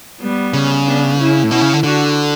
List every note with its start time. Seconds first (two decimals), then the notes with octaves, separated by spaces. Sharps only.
0.21 G3 B3
0.53 C#3
0.86 B3 D4
1.19 C#4 E4
1.43 A2
1.51 B2 C#4 E4
1.62 C#3
1.73 D3
1.83 D3 D4 F#4